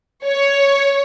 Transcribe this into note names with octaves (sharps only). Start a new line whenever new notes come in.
C#5